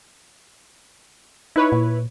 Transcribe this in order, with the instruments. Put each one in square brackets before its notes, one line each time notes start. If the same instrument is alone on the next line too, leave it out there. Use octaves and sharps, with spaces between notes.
[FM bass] D#4 [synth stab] E4 B4 C#5
[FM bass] A#2